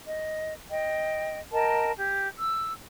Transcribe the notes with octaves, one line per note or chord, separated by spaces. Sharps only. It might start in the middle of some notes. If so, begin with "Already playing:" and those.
D#5
D#5 G5
A#4 D#5 G5 A5
G4
E6